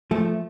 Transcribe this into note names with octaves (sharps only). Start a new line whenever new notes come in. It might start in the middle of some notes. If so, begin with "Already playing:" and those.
F3 A3